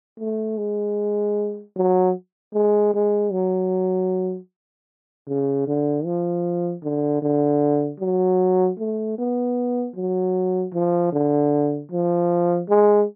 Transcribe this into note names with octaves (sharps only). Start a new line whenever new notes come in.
A3
G#3
F#3
G#3
G#3
F#3
C#3
D3
F3
D3
D3
F#3
A3
B3
F#3
F3
D3
F3
G#3